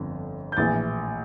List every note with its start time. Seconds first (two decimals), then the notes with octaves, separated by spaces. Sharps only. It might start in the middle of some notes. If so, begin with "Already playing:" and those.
Already playing: G1 F2 D3
0.52 G6
0.57 A#1 A2 E3 A6